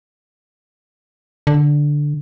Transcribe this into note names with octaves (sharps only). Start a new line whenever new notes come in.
D3